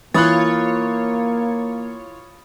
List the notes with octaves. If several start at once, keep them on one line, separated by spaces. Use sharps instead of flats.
E3 A#3 F4 C#5 B5 D#6 F#6 A6